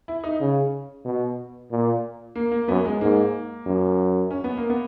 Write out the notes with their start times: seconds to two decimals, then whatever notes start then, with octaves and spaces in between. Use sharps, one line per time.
0.08 E4
0.24 D#4
0.40 C#3
1.05 B2
1.71 A#2
2.36 A#3
2.52 A#3
2.68 F#2 B3
2.85 G#3
3.01 G#2 A#3
3.66 F#2
4.31 C#4
4.44 B3
4.57 A#3
4.70 B3